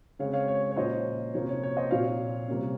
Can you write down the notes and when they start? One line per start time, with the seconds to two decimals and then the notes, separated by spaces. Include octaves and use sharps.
0.19 C#3 G#3 C4 C#5 F5
0.33 C#5 F5
0.48 C#5
0.71 C#5
0.76 A#2 F3 A#3 C#4 C5 D#5
1.34 C3 F3 A#3 C#4 C#5
1.49 C#5
1.63 C#5
1.77 C5 D#5
1.91 A#2 F3 C4 C#5 F5
2.48 C3 G3 A#3 C#4